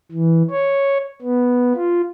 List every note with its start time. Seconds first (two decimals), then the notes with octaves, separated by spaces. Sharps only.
0.12 E3
0.50 C#5
1.22 B3
1.75 F4